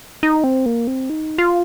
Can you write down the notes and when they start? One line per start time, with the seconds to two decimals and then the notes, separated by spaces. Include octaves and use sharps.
0.23 D#4
0.44 C4
0.66 A#3
0.87 C4
1.10 D#4
1.38 F4